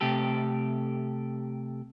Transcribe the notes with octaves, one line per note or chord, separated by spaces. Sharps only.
C3 A3 G4 A4